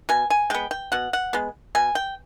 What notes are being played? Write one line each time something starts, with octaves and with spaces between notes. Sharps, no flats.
B2 G#5
G#5
G#3 B3 G5
G5
B2 F#5
F#5
G#3 B3
B2 G#5
G5